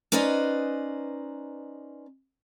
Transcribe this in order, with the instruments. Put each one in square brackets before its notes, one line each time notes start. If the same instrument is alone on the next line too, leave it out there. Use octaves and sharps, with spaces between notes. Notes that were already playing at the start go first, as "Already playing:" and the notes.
[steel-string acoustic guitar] C#4 D#4 B4 C5 D5 D#5